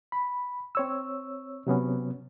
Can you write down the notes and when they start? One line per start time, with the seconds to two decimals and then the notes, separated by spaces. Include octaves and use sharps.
0.12 B5
0.75 C4 C#5 E6
1.67 C3 F#3 B3 C#4